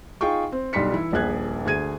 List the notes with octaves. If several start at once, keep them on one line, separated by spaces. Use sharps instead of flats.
D#4 F4 G#4 G5 C#6
C4
B1 G3 D4 C6 B6 C#7
E3 E4
D#1 A#1 G#4 F#6 G#6
D2 G#4 G#6 D#7